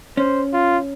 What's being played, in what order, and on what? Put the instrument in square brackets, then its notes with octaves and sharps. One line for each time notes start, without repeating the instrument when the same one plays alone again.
[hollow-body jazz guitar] C#4 [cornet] C5
[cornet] F4